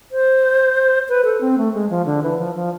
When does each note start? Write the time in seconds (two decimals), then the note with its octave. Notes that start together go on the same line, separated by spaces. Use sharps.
0.11 C5
1.09 B4
1.25 A4
1.41 C4
1.58 A3
1.74 G#3
1.90 F3
2.06 D3
2.23 E3
2.39 F3
2.55 F3